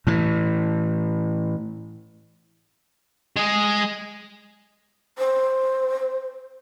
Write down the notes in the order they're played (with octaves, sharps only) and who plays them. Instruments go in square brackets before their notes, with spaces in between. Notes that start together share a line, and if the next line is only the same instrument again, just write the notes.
[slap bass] A2 E3
[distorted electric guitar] G#3 G#4
[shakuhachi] C5